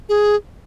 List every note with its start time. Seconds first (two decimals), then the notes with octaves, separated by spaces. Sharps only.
0.09 G#4